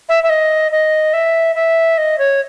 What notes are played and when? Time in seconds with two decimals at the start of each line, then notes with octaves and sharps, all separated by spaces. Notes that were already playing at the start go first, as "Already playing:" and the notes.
0.09 E5
0.23 E5
0.29 D#5
0.71 D#5
1.13 E5
1.55 E5
1.97 D#5
2.18 C#5